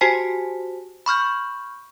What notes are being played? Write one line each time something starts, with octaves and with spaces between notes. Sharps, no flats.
F#4 G4 C5 G#5 A5 B6
B5 C#6 F6 G6